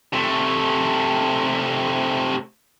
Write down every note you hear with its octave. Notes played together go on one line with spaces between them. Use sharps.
C3 A3